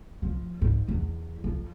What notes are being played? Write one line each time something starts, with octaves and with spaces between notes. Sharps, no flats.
F3
G#2
E2
F2